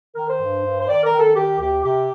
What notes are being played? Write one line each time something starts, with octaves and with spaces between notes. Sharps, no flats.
D#3 A#4
C5
G2
G2
C5
D#3 D5
A#4
D#3
A4
D#3 G4
D2 G4
C3 G4